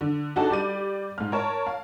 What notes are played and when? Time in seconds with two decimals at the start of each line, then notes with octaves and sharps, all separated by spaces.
0.01 D3
0.36 D4 D#4 F#4 G#4 A4 A5
0.50 G3 G4 D5 D#7
1.18 G#2 F6
1.32 A#4 C#5 A5
1.67 F5